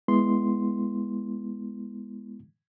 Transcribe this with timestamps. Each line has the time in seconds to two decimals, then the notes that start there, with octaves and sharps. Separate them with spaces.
0.08 G#3 B3 E4 C6